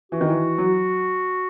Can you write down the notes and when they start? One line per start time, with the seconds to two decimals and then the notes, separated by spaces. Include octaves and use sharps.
0.12 E3 F#4
0.21 D#3
0.29 E3
0.58 F#3